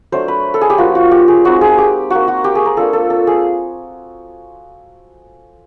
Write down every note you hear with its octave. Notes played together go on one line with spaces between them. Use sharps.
F#3 A3 D4 C5
B4
A4
G#4
G4
F3 A#3 C#4 F4 F#4
F#4
G4
G#4
G#3 C4 D#4 F#4
G#4
G4
A#3 D#4 F#4
F#4
G4
G#4
A#4
A#3 D4 F4 A4
A4
A4
G#4